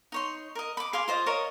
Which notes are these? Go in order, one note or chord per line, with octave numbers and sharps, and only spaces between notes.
D#4 C#5 C6
A#4 D#5
B5 D6
G#4 F5 C6 D6
F4 C5 D#5
A#4 C#5 D#5 F5